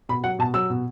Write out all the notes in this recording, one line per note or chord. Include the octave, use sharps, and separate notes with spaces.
B2 B5
F#3 F#5
B2 A5
F#3 E6
B2